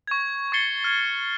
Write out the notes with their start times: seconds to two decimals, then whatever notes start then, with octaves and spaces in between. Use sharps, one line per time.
0.07 C#6 G#6
0.52 C#6 G#6 A6 C7 C#7 G7
0.84 F6 G#6